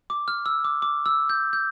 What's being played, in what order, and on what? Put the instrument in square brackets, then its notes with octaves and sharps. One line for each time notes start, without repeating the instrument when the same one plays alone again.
[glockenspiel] D6
F6
E6
D6
D6
E6
G6
G6